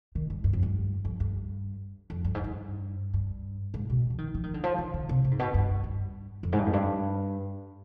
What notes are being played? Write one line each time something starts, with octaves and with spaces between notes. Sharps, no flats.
D#3
G2
G2
F2
G2
F2
G2
F2
G2
G#2
G2
G2
G#2
B2
F3
D#3
F3
D#3
D3
F3
D#3
D3
C3
C3
G#2
B2
G2
G2
F2
G#2
G2
F2
G2